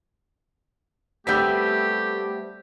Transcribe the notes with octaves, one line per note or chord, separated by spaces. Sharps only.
G3 A3 B3 C4 G4 E6 G6 B6